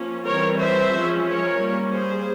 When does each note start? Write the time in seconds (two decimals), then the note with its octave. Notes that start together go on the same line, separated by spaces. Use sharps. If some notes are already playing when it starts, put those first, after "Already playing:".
Already playing: F3 A#3 C#4
0.27 E3 G3 C4 A#4 C#5
0.61 C5 E5
0.94 F3 G#3 C#4
1.28 A#4 C#5
1.61 G3 A#3 C#4
1.94 G#4 C5